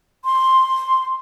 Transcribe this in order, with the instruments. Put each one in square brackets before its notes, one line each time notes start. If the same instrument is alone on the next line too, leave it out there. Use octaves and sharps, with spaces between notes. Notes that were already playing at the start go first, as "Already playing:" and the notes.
[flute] C6